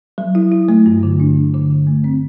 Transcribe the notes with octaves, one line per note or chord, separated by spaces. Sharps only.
F#3
E4
E4
A3
G2
D3
D4
D3
D3
D3
A3
C4